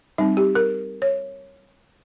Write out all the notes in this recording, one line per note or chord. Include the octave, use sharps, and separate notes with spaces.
G3 C4 D#4
G4
A#4
C#5